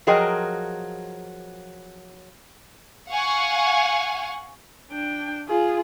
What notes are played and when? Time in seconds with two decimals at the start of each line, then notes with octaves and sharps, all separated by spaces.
0.07 F3 F#3 G#4 A#4 D#5 G5
3.10 F5 F#5 G#5 C#6
4.91 D4 G5
5.48 F4 G#4